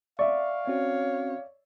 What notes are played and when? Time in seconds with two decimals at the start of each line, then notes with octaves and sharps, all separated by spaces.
0.19 D5 E5 F5 C#6
0.67 C4 C#4 F#4 C#5